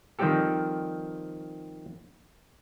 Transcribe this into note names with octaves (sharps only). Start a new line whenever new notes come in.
D#3 F3 G3 C4 G4 A4